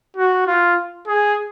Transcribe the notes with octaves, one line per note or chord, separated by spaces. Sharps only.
F#4
F4
G#4